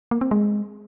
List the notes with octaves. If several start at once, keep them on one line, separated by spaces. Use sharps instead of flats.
A#3
C4
G#3